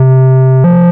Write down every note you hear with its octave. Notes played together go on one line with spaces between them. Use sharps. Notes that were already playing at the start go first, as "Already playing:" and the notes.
Already playing: C3
F3